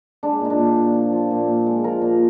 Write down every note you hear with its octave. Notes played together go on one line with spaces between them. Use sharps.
G#3 D4
A#2 D#4
D4
A#2
A#2
F3
F3
A#2
A#2
G#3
F3 A#4
A#2